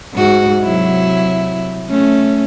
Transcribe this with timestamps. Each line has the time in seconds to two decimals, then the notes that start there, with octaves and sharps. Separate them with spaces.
0.14 G#2 F#4
0.61 C3 F#3 E4
1.90 A3 C#4